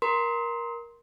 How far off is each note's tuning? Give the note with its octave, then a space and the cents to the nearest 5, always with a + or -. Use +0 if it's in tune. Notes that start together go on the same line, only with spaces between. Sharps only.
A#4 +15 C6 +0